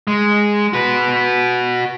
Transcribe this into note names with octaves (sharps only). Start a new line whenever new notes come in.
G#3
F#4 B4